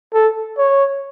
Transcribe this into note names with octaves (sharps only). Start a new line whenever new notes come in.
A4
C#5